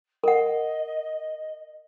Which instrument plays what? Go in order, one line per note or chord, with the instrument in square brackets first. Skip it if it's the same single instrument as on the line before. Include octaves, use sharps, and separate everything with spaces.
[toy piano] A#4 F#5 [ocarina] D#5